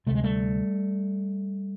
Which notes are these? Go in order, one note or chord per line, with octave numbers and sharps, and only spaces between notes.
D2 C3 A3
G#3
G3 A3